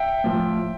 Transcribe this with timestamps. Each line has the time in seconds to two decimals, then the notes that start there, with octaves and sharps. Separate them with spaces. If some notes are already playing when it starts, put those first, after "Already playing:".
Already playing: E5 G5
0.24 A2 F3